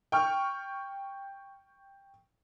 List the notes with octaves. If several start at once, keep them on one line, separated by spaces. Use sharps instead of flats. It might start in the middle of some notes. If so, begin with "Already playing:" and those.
G5 C#6 F6